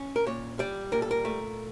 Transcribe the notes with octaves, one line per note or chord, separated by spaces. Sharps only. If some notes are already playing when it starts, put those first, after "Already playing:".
Already playing: C#4
A#4
A#2 C#5
G3 D5
A#2 A#4
A4
A#4
A3